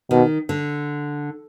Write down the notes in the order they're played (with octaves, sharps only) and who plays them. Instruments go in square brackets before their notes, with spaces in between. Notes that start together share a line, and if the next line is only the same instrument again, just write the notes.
[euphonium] B2 [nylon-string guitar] D#3
[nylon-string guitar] D3